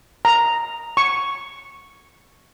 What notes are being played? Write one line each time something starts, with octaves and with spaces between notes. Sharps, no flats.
A#5
C#6